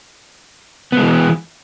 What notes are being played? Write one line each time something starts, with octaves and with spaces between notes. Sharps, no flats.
E3 G#3 B3